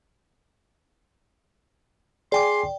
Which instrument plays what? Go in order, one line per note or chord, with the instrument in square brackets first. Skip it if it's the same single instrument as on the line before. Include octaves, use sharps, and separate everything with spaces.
[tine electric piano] G#4 G#5 D6 [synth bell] D5 G5 [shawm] C6